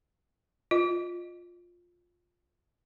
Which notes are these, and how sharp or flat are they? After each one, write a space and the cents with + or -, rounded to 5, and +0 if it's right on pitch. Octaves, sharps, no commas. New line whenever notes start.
F4 +10 D#5 -20